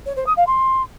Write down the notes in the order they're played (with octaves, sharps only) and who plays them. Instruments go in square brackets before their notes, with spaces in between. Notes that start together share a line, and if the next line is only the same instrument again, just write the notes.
[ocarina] C#5
C5
D#6
F5
C6